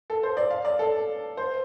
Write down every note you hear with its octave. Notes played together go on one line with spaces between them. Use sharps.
A4
C5
D5
F5
D5
A4
C5